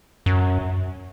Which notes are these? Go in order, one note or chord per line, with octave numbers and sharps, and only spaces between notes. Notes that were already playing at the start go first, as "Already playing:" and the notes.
F#2